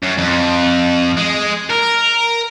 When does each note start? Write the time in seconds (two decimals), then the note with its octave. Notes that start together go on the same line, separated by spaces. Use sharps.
0.03 F#2
0.18 F2
1.17 G#3
1.70 A#4